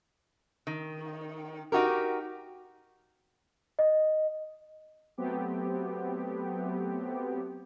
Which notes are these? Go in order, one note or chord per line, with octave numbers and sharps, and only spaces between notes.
D#3
D#4 F#4 G4 A#4
D#5
F#3 A3 B3 C4 G4